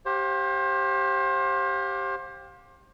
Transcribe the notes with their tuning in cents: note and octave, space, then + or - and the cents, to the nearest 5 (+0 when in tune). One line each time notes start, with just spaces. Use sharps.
G4 +0 C5 +30 F5 +30